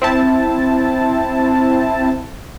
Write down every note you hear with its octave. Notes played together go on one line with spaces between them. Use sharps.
C4 E4 A5